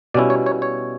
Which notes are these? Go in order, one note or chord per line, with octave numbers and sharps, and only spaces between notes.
B2 G3 C#4 E4 D5
C#5
C#5
C#5